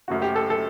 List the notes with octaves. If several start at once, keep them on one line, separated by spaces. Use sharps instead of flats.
F#1 F#2 F#3 A3 F#4
G4
A4
A4